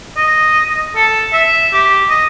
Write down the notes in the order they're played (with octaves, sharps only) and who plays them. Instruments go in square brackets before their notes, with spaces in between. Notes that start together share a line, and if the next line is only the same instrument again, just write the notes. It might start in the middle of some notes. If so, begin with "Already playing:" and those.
[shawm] D#5
A4
E5
G4
D#5